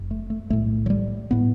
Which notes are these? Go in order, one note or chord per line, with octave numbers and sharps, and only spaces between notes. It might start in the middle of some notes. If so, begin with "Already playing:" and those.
Already playing: F#1 F#2
A3
A3
B1 A2 A3
F#3
G3
A2 B3